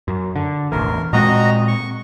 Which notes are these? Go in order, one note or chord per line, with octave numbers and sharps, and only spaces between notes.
F#2
D3
E1 A1 E3 A#4
A#2 G#3 C4 F#4 D#5 A#5
C#6